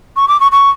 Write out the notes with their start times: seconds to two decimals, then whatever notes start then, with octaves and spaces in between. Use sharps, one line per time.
0.16 C#6
0.28 D6
0.40 C#6
0.52 C#6